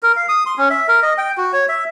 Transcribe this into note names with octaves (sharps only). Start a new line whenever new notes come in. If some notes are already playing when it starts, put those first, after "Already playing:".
A#4
F5
D#6
C6
C#4
E5
A#4
D#5
G5
F#4
C#5
E5